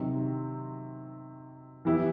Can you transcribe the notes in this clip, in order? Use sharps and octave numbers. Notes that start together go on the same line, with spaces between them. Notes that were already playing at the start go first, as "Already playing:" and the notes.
Already playing: C3 D#3 F#3 C4
E3 B3 E4 G4